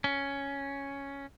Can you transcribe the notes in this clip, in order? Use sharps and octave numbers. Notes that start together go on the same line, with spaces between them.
C#4